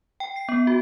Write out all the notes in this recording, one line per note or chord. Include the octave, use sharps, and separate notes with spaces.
G5
C7
B3
F#4